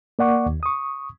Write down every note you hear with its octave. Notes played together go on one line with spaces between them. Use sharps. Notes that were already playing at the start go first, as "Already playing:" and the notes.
A#3 D5 F#5 C#6 D6
D#2
C#6 D#6